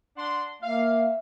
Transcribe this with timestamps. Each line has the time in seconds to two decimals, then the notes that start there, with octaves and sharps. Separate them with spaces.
0.17 D4 F#5 C6
0.62 A#3 E5 F5